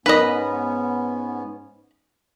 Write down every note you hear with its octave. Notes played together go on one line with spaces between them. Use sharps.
G#2 B3 C#4 D#4 A#4 B4 D#5